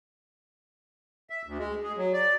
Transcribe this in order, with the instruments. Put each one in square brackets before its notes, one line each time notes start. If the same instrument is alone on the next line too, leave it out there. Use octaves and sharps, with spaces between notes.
[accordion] E5
D2
G#3
G#4
F#3
D5